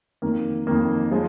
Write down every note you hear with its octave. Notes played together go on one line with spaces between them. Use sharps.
F2 D#3 A#3
F2 D#3 A#3
F3 G#3 F4